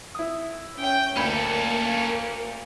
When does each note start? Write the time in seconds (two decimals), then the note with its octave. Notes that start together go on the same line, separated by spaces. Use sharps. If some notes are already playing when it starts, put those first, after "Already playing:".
0.15 E4 D#6
0.77 C#4 G5
1.16 D2 A#3 C#4 A4 B5